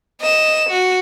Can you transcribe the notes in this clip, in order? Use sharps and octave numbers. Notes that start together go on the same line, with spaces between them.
D#5 E7
F#4